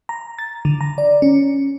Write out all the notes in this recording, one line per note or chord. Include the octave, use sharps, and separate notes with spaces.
A#5
A6
D3
A#5
D5
C#4